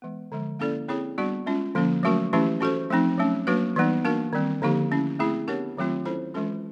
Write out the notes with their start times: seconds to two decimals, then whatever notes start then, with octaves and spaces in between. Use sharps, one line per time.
0.02 E3 G#3 B3
0.32 D3 F3 G#3
0.59 A#3 C#4 E4 A4 D5
0.89 C4 E4 G#4 C#5
1.18 G3 B3 D4 F#4
1.46 G#3 C#4 F4
1.75 D3 F3 A#3 C#4
2.03 F#3 A3 C#4 F#4 A#4
2.33 E3 A3 C#4 E4 G4
2.61 C#4 F#4 A4 C5
2.90 F3 A3 C4 D#4
3.18 F#3 A3 C#4
3.47 F#3 A#3 D4 F#4 B4
3.76 E3 G3 B3 D#4
4.05 A#3 D4 F#4 A#4
4.33 D#3 G3 C4
4.62 D3 F3 A#3 D#4 G4
4.91 A3 C#4 E4
5.19 A3 C4 E4 G#4
5.48 B3 D4 G4 A#4 C#5
5.77 D#3 F#3 A3 C4 F4
6.06 C#4 E4 A4 C5
6.34 E3 G#3 C#4 F4 A4